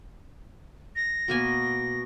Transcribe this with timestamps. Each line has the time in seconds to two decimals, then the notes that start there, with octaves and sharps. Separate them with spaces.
0.96 A#6
1.28 B2 A#3 G#5